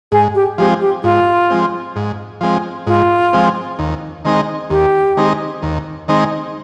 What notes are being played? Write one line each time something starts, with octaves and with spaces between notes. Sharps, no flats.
G#2 G#4
G4
F3 G#3 C4 G4
G4
G#2 F4
F3 G#3 C4
G#2
F3 G#3 C4
G#2 F4
F3 G#3 C4
D#2
D#3 G#3 C4 D#4
D#2 G4
D#3 G#3 C4 D#4
D#2
D#3 G#3 C4 D#4